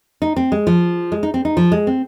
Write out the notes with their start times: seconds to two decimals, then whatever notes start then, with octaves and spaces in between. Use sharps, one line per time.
0.22 D#4
0.36 C4
0.52 G#3
0.67 F3
1.12 G#3
1.23 D#4
1.34 C4
1.45 D#4
1.57 F3
1.72 G#3
1.87 C4